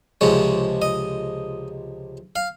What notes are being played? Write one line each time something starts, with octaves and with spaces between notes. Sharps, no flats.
C#2 C3 F3 G#3 C#5
D#5
F5